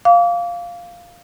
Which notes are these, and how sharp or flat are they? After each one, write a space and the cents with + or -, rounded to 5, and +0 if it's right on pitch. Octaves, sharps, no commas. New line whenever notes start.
F5 +0 D6 -35